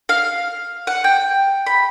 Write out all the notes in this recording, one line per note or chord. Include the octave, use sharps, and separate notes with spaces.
F5
F#5
G5
B5